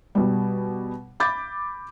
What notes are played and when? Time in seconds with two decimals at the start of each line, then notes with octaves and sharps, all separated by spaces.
0.15 B2 G3
1.20 B5 D6 G6 A6